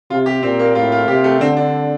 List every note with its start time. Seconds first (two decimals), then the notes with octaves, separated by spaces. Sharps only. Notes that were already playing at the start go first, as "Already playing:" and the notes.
0.10 C3 F4
0.26 G4
0.43 A#2 C4
0.59 A#3
0.75 A2 F4
0.92 F4
1.07 C3 G4
1.24 A3
1.40 D3 C4
1.57 D4